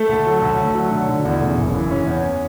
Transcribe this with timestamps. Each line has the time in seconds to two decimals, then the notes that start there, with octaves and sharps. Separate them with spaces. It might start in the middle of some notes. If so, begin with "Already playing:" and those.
Already playing: A3 A4
0.09 D2
0.26 F#3
0.42 D2
0.59 D2
0.75 F#3
0.91 D3
1.08 D3
1.25 E2
1.40 C#3
1.57 F#1
1.74 E3
1.90 E3 C#4
2.07 E2